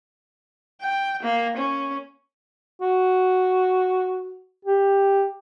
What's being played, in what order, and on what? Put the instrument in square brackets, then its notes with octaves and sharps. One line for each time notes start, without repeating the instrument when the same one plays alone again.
[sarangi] G5
A#3
C#4
[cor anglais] F#4
[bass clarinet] G4